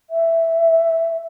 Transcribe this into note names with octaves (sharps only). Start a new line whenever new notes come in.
E5